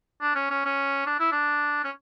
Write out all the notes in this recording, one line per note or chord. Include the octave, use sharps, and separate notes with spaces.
D4
C#4
C#4
C#4
D4
E4
D4
C#4